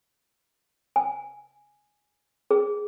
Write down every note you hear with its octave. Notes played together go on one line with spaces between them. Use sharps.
G#5
G#4